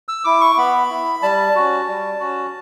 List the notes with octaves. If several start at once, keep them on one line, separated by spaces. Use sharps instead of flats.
E6
E4 D6
C#6
B3 B5
E4
G3 A5
C#4 F#4
G3
C#4 F#4